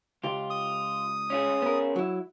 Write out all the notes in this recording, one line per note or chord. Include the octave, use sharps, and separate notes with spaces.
C#2 F4 G4
D#6
C#4 F4 G#4
B3 A#4
F#3 E4